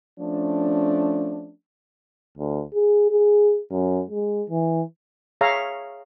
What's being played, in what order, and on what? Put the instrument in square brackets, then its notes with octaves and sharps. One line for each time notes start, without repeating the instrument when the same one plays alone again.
[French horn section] F3 A3 C#4 D4
[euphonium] D2
G#4
G#4
F#2
G#3
E3
[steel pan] G#4 C#5 E5 F5 A#5